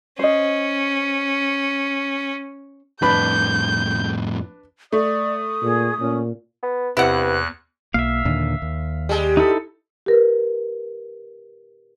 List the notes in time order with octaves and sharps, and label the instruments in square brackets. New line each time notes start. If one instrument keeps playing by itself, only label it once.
[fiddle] C#4 [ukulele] C5 D#5
[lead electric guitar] F2 A2 [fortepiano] D4 B4 B5 [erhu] G6
[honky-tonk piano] A3 [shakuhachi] D5 [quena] D#6
[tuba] A#2 [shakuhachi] G#4
[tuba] A#2 [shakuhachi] C#4
[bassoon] B3
[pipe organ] E2 F#6 [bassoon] G2 [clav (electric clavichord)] C3 B4 [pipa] E4 F#5
[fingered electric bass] B1 A#3 [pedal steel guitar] E5 F5
[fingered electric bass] D#2 A#2 D3
D#2
[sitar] G3 G#3
[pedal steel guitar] D#4 E4 A4
[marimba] G4 A#4 B4